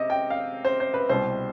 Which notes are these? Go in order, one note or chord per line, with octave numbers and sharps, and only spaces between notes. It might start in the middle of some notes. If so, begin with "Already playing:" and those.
Already playing: C3 D#5
G5
F5
C5
C5
B4
C2 B2 G3 C5